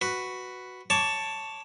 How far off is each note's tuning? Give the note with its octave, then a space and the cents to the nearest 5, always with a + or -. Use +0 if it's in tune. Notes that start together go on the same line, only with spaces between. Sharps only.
F#4 +0 B4 +0
C#5 +0 A5 +5 D6 -20